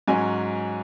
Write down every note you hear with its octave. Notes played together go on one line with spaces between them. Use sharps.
G#2 F#3 C#4 G#5